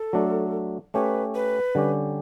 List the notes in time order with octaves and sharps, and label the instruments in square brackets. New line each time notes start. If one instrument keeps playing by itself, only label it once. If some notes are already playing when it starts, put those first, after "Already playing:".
Already playing: [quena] A4
[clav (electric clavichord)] F#3 A3 D4
[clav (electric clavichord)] A3 C#4 G4 C#5 [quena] B4
[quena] B4
[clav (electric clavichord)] D3 G3 C#4 G4